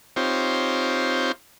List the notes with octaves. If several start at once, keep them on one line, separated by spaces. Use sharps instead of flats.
C4 D#4 F4 G4 C5 C#5